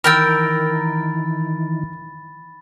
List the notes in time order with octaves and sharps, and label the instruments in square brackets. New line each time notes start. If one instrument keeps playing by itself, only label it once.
[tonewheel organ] D#3 E3 [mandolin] A#4 G5 E6 [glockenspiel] B5 A6